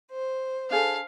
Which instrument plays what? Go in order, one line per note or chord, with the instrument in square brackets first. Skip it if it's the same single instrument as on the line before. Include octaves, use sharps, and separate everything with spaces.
[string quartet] C5
[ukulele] D4 G#4 A4 [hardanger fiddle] F5